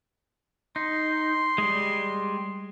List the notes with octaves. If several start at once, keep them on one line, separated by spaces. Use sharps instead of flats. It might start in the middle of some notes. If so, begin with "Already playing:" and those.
D#4 C6
G3 G#3